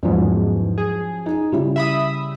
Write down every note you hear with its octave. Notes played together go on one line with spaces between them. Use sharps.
E2 G#2 F3 F#3 C#4
G#4
D#4
C#3 G3 E4
E5 B5 D#6